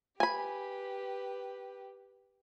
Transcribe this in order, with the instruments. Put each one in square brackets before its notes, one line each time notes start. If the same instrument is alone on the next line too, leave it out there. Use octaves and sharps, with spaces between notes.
[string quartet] G4 B4 [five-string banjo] G#5 B5